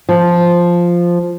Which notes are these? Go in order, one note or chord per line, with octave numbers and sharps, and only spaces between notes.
F3